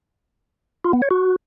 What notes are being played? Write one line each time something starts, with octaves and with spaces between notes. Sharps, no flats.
F4
B3
C#5
F#4